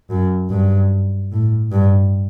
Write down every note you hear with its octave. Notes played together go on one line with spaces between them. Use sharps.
F#2
G2
A2
G2